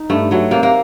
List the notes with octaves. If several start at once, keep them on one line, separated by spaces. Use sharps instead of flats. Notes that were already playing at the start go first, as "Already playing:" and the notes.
Already playing: D#4
G2 A3
F#3 A3
C3 A#3
A#3